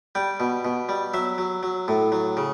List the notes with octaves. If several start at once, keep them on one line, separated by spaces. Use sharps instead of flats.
G3 G5
B2
B2
G3
F#3 E5
F#3
F#3
A2
F#3
C#3